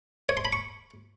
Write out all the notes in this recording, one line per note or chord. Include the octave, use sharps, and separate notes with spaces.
C#5
C6
B5
C#6